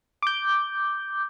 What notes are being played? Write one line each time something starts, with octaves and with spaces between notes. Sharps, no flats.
D6 G6